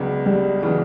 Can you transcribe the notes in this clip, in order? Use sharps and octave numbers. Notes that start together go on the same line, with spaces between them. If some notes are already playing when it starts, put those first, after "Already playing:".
Already playing: C#2 C#3 F#3 B3 D4
G3
C#3 E3 F#3 B3 D4